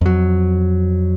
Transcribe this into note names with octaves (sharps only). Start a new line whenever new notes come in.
F2 F#3